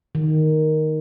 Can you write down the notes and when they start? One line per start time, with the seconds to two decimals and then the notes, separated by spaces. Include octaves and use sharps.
0.15 D#3